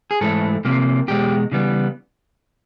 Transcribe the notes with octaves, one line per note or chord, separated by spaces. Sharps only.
G#4
G#2 E3 A3 A4
C3 F3 A#3
E2 B2 G#3 G4
C#3 E3 G3 B3